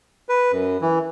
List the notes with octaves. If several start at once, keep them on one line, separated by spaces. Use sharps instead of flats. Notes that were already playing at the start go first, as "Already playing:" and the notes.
B4
F#2
E3